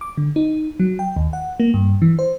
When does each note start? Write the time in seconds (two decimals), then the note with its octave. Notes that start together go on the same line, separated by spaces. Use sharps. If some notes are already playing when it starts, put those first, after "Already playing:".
0.01 D6
0.17 D3
0.36 D#4
0.80 F#3
0.99 G5
1.16 D#2
1.33 F#5
1.60 A#3
1.74 G2
2.02 E3
2.19 C5